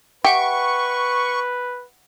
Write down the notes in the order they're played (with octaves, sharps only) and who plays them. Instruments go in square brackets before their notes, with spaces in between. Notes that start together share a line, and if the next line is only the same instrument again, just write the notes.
[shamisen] G4 [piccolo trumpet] B4 [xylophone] E5 F#5 G5 [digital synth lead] C#6